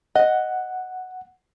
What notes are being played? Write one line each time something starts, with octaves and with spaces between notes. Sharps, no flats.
D#5 F#5